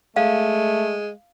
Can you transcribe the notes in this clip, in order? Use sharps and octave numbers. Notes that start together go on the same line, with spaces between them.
G#3 A3 F5